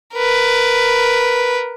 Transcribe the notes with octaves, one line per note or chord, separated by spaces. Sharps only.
A#4 B4